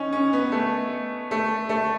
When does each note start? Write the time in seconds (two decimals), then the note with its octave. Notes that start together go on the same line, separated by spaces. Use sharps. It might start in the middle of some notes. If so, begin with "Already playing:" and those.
Already playing: C#4 D#4
0.12 C#4
0.33 B3
0.52 A3
1.31 A3
1.69 A3